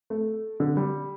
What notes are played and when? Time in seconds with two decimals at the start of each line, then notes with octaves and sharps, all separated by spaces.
0.10 A3
0.60 D3
0.77 G3